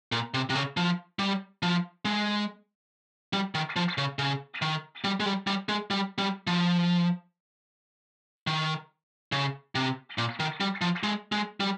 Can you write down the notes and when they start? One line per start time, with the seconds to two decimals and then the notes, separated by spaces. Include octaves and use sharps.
0.12 A#2
0.34 C3
0.50 C3
0.55 C#3
0.77 F3
1.19 G3
1.63 F3
2.05 G#3
3.33 G3
3.55 D#3
3.76 F3
3.98 C#3
4.19 C#3
4.62 D#3
5.04 G3
5.20 G#3
5.26 G3
5.47 G3
5.69 G#3
5.90 G3
6.18 G3
6.47 F3
8.47 D#3
9.32 C#3
9.75 C3
10.18 A#2
10.40 D#3
10.60 G3
10.81 F3
11.03 G#3
11.32 G#3
11.60 G3